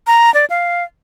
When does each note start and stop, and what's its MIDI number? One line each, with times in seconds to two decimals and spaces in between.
0.07 0.33 82
0.34 0.45 74
0.50 0.84 77